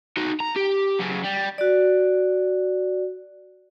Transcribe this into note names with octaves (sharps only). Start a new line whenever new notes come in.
D#4 F#4
A#5
G4
F#2 C#3
G3
F#4 D5